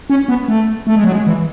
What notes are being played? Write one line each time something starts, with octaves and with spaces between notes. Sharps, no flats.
C#4
B3
A3
A3
G#3
F#3
G#3
E3